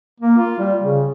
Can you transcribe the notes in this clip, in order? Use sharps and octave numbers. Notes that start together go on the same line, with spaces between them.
A#3
F4
G3
C#3